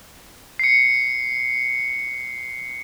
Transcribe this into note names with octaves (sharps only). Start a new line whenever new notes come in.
C7 C#7